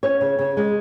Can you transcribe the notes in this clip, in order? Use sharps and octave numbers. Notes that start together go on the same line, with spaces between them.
C#4 C#5
C#3
C#3
G#3